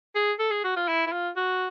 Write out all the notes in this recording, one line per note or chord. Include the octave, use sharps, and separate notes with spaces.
G#4
A4
G#4
F#4
F4
E4
E4
F4
F#4